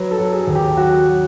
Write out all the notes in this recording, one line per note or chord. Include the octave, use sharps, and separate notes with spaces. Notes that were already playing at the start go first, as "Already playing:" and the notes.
Already playing: F#3 B4
A4
F#3
G#4
D#2
G4
F#3 F#4
F#3